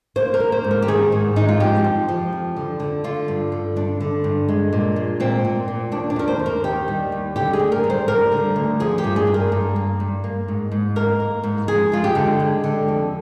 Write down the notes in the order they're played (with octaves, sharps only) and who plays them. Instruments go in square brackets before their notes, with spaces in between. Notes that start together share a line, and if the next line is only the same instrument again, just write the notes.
[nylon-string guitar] A#3 C5
A#4
A#3
C5
G#2
A#4
G4
D#3 G#4
G#2
G#2 D#4
F4
F3 G4
F2
F3
F2
D3
D3
D3 F4
G2
D3
G2 D4
D3
G2
G#3
A#2
G#3
A#2 C4
A#2
A#2
D#2 D4
D4
D#2 A#4
C5
D#2
A#4
D#3 G4
G3
D#2
D3 G4
G#4
D2
A#4
G3
C5
G3 A#4
D3
D2
F3 G#4
G4
G2
G#4
G2
A#4
G2
A#3
G2
A#3
G#2
G#2
A#3 A#4
A#3
G#2
F2 G#4
G#3 F4
G4
D3
G#3
D3
F2